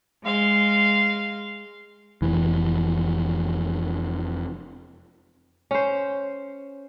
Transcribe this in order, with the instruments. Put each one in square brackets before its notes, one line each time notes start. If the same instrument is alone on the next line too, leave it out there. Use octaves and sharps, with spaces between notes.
[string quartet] G#3 F5 C6
[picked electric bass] F1 E3
[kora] C#4 C5